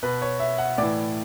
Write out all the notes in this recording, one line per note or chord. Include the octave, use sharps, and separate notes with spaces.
B2 B4
C#5
E5
F#5
A2 E3 D5